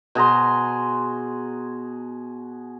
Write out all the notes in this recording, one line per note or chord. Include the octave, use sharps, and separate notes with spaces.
B2 G#4 A#5 C6